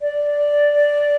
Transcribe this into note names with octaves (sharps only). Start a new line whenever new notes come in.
D5